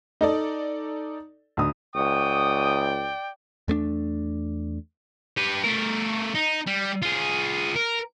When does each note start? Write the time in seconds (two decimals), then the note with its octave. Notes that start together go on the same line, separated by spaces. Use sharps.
0.21 D#4 A4 D5 D#5
1.57 D2 D#6
1.95 C#2 D5 F#5 G5 C#6 D#6
3.68 E2 A3 A#3 D4
5.37 G4 B4
5.64 A3 A#4
6.35 D#4
6.67 G3
7.02 F4 G#4
7.76 A#4